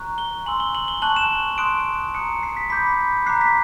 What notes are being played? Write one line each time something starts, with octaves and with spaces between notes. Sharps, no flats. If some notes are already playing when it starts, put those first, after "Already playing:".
Already playing: A#5 C#6 F#6
G7
G#5 C6 E6 F#7
G7
F#7
G7
A5 C#6 F#6 F#7
E7
C6 D#6 F#6 D7
A#5 D#6 F#6 C#7
C7
B6
B5 D6 G6 B6
A#5 D6 F#6 C7
B6